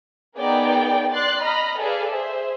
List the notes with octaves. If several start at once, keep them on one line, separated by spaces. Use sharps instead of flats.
B3 D#4 G#4 A#4 D5 G5
D5 C6 F#6 A6 C7
D#5 A#5 B5 F6
G#4 A4 B4 D5 F5
G#4 C5 E5